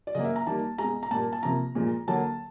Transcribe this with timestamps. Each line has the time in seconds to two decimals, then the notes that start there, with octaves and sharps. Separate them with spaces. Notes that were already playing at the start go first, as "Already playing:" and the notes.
0.07 D5
0.15 C#3 F#3 A#3 D#5
0.24 E5
0.36 A#5
0.46 D#3 G3 A#3 A5
0.78 G#3 A#5
0.84 B2
1.03 A#5
1.11 A#2 G3 A#3 A5
1.33 A5
1.43 C3 F3 A#3 A#5
1.75 A#2 F3 G#3
2.07 D3 F#3 A#3 A5